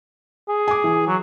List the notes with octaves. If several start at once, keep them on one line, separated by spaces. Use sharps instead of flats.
G#4
G#5 D6
E3
F#3